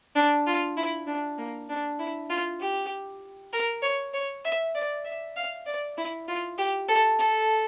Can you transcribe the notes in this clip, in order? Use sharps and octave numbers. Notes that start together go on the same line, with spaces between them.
D4
F4
E4
D4
A#3
D4
E4
F4
G4
A#4
C#5
C#5
E5
D5
E5
F5
D5
E4
F4
G4
A4
A4